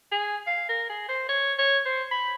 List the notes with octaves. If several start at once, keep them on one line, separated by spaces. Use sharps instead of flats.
G#4
F5
A#4
G#4
C5
C#5
C#5
C5
B5